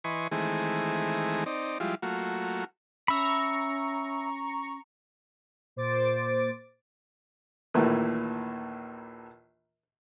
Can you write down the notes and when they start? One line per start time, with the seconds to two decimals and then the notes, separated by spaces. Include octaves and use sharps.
0.04 E3 B4 D#5 G#5 C6 C#6
0.32 D#3 E3 G#3 A3 C4 G#4
1.46 C4 D#4 D5
1.80 F3 G3 G#3 E4 F4
2.02 F#3 A3 A#3 F4 F#4
3.08 C#4 E5 A#5 B5 C#6
5.76 A#2 C5 D6 A6 D7
7.74 A#1 D#2 A#2 E3 A3